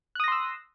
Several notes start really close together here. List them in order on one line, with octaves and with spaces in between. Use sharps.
F#6 D#6 A#6 C6 E6